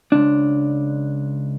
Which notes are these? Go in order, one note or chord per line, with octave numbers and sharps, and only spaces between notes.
C#2 D4